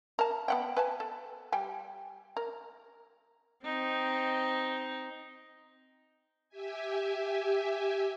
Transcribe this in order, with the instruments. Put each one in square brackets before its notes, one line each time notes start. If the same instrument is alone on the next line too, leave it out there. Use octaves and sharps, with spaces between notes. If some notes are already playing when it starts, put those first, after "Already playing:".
[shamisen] A#4 A5
B3 F#5 G5
B4 G#5 A5
A4
G3 G5 G#5
A#4
[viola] C4 D#4
[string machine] G4 E5 G#5